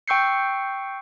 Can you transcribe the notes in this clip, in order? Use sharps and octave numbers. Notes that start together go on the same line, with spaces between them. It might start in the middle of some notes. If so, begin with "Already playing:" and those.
G5 C#6 E6 G6 C7 C#7